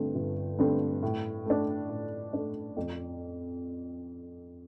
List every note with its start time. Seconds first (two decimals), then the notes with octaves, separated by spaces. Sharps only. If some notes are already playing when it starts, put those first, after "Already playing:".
Already playing: G1 G2 D3 A3 C4
0.15 G1
0.58 G2 D3 A3 C4
1.03 A2
1.46 A3 D4
1.89 A2
2.33 A3 D4
2.77 F2